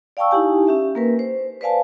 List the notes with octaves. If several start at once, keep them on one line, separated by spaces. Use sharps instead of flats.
D5 F5 G5 A5 C#6 E6
D#4 E4 G4 G#5
C#4 G4 E5
A#3 A#4 B4
C5
B4 C5 D5 F5 G#5 A5